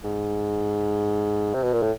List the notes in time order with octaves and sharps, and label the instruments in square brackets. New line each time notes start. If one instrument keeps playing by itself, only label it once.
[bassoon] G#2
C3
B2
A#2
A2